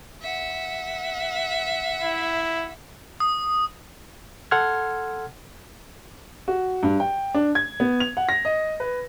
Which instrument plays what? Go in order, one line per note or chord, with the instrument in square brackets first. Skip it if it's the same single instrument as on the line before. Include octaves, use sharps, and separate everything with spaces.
[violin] E5 F#5
[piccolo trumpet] E4
[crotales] D#6
[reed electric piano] A4 F#5 C6 F6 G#6
[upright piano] F#4
G2
G5
D4
G#6
B3
F7
F#5
A#6
D#5
B4